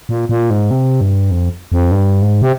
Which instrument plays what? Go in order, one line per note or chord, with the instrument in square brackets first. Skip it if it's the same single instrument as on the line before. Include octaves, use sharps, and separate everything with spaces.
[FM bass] A#2
A#2
G#2
C3
G2
F2
F2
G2
G#2
C3